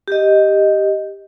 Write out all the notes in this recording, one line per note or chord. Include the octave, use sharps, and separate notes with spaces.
G4 D#5